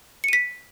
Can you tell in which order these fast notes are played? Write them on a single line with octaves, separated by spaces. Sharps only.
C#7 D#7 B6